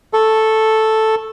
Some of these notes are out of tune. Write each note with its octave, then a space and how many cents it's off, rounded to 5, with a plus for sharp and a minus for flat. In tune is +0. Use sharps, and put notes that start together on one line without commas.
A4 +0 C#6 -15